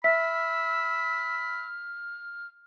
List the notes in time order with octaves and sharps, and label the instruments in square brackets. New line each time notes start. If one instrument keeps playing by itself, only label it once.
[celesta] E5 B6 [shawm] B5 [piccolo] E6 [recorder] F6